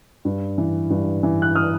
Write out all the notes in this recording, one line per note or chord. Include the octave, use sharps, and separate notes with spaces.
G2
E3
G2
E3
F#6
D#6 F6